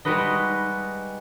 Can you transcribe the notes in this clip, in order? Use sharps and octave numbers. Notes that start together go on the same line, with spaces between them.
G3 G#3 D#4 F#4 B4 D#5